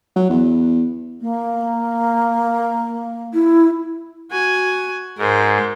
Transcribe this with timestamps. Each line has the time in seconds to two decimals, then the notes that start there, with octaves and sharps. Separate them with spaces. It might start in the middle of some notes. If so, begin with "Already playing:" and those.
0.15 F#3
0.29 E2
1.21 A#3
3.34 E4
4.31 F#4 G#5
5.18 G#2 A#4 C5